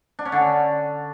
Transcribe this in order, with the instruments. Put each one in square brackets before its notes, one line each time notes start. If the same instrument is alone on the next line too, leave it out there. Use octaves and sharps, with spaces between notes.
[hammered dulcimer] D4
C#4
D3